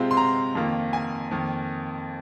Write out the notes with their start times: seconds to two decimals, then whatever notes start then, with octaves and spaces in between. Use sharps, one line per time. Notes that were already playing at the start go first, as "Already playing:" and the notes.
Already playing: C3 G#3 C4 F4
0.11 C6
0.17 A#5
0.55 F2 D#3 A#3 F4
0.93 G#5
1.31 F2 D#3 A#3